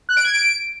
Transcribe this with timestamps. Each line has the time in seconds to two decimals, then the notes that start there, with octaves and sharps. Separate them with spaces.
0.09 F#6
0.17 D7
0.25 G#6
0.33 D7